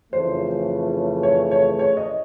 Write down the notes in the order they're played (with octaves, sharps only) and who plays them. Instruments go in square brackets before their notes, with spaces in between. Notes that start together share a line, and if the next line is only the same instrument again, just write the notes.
[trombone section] F2 C#3 E3 A3 [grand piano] C5
[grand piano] C#5
C#5
C#5
D#5